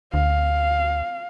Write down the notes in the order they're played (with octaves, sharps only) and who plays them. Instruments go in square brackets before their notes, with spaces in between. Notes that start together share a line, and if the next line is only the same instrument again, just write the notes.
[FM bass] D2 [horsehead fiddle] F5